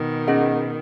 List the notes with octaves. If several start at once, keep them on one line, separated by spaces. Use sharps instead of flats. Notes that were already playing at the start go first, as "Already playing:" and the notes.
Already playing: B2 D#3
C#4 G#4 D#5 F#5